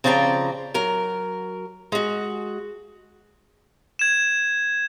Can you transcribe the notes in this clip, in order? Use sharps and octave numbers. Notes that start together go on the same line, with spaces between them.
C#3 F3 C4 D5 A5 A#5
F#3 A#4
G#3 F#4
G#6 E7